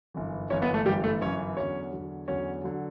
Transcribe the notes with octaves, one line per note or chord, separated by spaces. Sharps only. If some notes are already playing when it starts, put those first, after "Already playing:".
G1 F#2 E3
G1 F#2 E3 C#4 C#5
B3 B4
A3 A4
G1 F#2 E3 G3 G4
A3 A4
G1 F#2 E3 C#4 C#5
E2 D3 F#3 C#4 C#5
E2 D3 F#3
E2 D3 F#3 C#4 C#5
D3 F#3